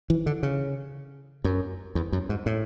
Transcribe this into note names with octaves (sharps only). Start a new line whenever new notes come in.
E3
D3
C#3
F#2
E2
F#2
G#2
A2